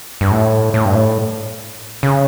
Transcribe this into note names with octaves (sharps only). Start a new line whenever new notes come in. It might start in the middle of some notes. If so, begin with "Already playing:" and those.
G2
A2
A2
G2
A2
C#3